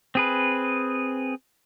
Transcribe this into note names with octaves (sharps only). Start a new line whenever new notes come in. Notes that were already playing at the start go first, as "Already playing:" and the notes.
C4 G#4 B4